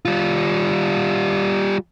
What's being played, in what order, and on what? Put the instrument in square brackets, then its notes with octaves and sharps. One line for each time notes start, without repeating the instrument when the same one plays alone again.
[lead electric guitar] G3 F4